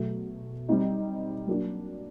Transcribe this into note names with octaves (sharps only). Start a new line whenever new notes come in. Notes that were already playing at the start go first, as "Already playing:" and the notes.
Already playing: B2 F#3 A3
G3 C4 D#4
F#3 A#3 D4